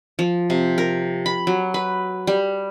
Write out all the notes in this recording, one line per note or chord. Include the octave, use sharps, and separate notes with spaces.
F3
C3
A#4
B5
F#3
B4
G3